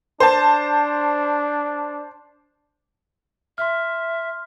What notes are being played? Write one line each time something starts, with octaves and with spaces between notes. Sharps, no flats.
D4 C5 A5
E5 C6 F6